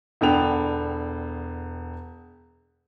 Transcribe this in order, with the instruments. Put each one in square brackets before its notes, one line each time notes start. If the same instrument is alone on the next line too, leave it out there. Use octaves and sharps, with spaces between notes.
[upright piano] E1 D3 B3 G5 F7